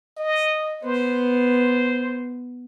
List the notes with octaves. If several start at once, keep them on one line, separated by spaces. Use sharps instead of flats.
D#5
B3 C5